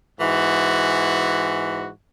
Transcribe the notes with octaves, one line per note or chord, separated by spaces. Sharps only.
G#2 E3 F#4